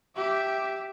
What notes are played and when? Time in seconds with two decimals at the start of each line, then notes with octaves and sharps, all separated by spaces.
0.16 G4 E5